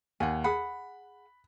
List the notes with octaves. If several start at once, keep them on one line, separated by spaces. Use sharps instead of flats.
D#2 F#5 G#5
G#4 F#5 B5